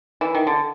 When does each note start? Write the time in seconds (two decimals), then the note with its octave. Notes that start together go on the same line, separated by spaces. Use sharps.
0.21 E3
0.35 D#3
0.47 D3